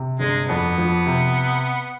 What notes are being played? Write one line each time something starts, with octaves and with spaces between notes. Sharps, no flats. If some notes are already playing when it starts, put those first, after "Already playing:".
Already playing: C3
G1 G#3
F2 B3
F3
C3